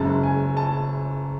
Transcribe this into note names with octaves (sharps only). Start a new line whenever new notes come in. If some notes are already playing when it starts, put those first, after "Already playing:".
Already playing: F#1 F#2 C#3 G#3 A5
G#5
A5